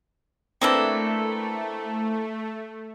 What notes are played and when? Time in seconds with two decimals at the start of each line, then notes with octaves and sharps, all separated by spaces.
0.61 A3 A#3 C4 D4 E4 A4 B4